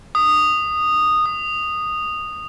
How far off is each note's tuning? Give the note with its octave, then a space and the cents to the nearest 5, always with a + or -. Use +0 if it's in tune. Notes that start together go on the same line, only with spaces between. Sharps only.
D#6 -10
D#6 -10